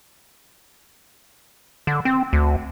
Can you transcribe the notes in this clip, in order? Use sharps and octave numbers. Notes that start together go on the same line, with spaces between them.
D3
C4
D2